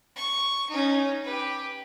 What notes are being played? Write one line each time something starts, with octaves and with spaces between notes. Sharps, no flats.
C#6
C#4 D#4
G4 B4